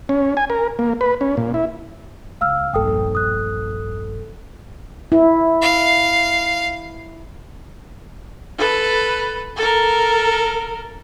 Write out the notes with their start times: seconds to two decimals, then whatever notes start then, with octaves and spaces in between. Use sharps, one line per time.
0.09 C#4
0.37 G#5
0.50 A#4
0.79 A#3
1.01 B4
1.21 C#4
1.37 A#2
1.54 E4
2.41 C#2 G#3 F5 E6 F6
2.73 E1 A#1 G2 A4 G5 D#6
3.15 D#6 F#6
5.12 E4
5.62 F5
8.58 A4 B4
9.56 A4 A#4